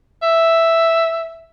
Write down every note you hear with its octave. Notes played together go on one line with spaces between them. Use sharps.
E5